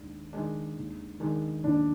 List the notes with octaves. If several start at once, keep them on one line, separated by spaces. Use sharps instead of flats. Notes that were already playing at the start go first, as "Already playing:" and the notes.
Already playing: D#2 D#3 G#3 D4
D#3 G#3 D4
D#2
D#3 G#3 D4
D#2 D4